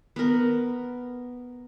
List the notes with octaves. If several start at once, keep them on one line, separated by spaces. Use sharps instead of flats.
B3 A#4